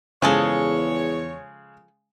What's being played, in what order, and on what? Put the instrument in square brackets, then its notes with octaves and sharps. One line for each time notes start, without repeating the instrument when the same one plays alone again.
[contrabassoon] E2 [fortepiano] C#3 G#3 [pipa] F3 G#4 A4 [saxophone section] C#5